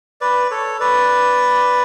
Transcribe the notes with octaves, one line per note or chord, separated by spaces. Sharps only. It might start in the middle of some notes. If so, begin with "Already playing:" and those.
B4 D5
A4 C#5
B4 D5